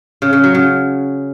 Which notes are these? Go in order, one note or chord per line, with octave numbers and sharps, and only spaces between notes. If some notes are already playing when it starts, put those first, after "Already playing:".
C#3
C#3
F#3
C#3